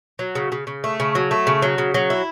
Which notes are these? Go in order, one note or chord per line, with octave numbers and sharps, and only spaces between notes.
F#3
C#3
C#3
C#3
A3
C#3
F#3
A3
C#3
F#3
C#3
F#3
E4